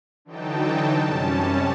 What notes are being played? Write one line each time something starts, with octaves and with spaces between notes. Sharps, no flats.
D3 E3 F#3 D#4 G5 A5
F#2 C3 G3 C#4 A5